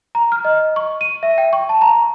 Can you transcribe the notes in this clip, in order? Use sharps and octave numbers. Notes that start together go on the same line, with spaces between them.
A#5
F6
D#5
C#6
D#7
E5
G5
C#6
A5
A#5